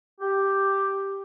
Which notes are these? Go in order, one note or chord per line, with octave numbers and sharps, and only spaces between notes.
G4